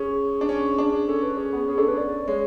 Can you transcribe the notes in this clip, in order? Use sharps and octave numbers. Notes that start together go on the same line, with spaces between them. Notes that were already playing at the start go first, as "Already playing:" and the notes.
Already playing: C#4 G#4
D4
C#4
D4
C#4 A4
B4
C#4 G#4
B3 G#4
C#4 G#4
D4 A4
C#4 B4
D5
G#3 C#5